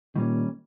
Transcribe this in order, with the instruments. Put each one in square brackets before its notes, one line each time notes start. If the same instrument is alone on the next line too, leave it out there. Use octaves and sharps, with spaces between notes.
[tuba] A#2 [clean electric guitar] D#3 G3 A#3 C#4